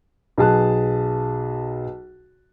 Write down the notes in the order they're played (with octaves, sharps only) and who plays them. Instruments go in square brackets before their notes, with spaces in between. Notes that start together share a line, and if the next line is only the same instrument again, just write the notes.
[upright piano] B1 G#4 A5 F#6